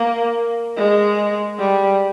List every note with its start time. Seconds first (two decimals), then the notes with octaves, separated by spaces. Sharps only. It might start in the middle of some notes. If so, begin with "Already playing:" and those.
Already playing: A#3
0.77 G#3
1.59 G3